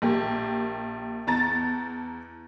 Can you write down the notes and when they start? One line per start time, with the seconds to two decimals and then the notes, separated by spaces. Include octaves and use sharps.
0.02 A#1 A#3 G4
1.27 E2 A5 A#5 A6